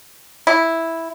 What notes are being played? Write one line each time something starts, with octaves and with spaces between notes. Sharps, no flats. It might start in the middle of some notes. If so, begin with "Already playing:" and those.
E4